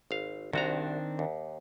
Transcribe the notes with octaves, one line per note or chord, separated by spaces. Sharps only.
G#1 F5
C2 D#3 C4 D4 F#4 A#5
D#2